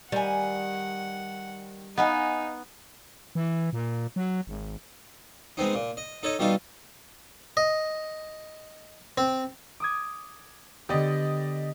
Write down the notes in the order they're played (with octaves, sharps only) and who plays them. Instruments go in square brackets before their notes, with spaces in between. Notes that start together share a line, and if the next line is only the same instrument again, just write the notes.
[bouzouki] D#3 G#5 [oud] G3 [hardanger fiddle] F#5
[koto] B3 [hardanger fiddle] D#4 [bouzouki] D#5 F5 G#5
[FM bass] E3
A#2
F#3
G#1
[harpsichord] G#3 B3 C4 D#4
A#2
D#5
D#4 A4 C#5 D#5
B2 G3 D#4 F4 A4
D#5
C4
[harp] D6 D#6 G#6
[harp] D3 B3 [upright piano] G4 D5 D#5